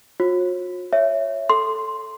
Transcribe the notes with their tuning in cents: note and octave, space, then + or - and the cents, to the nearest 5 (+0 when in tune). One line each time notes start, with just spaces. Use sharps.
F#4 -45 C#5 -45
C#5 +0 E5 +10
A4 +0 C6 +0